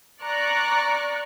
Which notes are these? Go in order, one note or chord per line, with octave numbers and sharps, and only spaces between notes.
D5 A#5 C#6 F#6